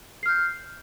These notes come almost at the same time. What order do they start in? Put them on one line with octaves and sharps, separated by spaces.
C7 F6 G6